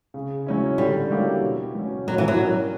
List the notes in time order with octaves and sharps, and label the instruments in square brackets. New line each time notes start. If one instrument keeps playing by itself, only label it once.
[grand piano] C#3
F#3 C#4 E4
[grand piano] D3 [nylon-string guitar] G3
[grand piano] F#3 A#3 E4 G4
B2
F#3 C#4
[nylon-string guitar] F#3 [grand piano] G3
[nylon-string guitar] E3
F#3
[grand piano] C#4 E4 A#4